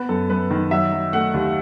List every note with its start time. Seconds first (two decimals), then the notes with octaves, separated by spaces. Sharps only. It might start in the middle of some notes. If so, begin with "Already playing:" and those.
Already playing: B3 B4
0.09 F#2 A4
0.30 F#2 B4
0.51 D#3
0.71 F#3 E5
0.92 F#3
1.13 A3 F#5
1.34 D#2